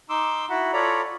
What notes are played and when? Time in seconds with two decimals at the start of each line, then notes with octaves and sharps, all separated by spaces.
0.10 D#4 C6 D6 E6
0.50 E4 F#4 F#5 B5
0.73 F4 A4 C#5 D5 A#5 B5